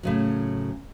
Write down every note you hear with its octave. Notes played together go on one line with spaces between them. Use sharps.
A2 C#3 F#3